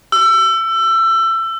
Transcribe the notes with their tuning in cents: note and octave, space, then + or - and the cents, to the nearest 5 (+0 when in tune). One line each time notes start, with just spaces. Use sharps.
E6 +25